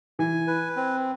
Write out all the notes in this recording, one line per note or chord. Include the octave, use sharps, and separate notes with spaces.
E3 G#5
B4
C4